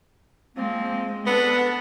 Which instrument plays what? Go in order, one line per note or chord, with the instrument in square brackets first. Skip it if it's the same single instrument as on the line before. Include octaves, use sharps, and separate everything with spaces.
[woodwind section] F3 A#3 C4 [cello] G#3
[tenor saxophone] B3 [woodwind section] D4 F#5 [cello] A4